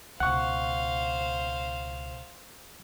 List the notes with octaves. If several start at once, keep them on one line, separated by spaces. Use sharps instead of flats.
C#2 B2 C5 F5 F#5 C#6